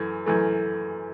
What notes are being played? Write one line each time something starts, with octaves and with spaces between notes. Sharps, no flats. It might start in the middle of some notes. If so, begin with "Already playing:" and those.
Already playing: F#2 E3 A3
F#2 E3 A3